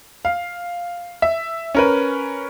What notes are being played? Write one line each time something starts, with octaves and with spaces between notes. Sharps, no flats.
F5
E5
C#4 A#4 B4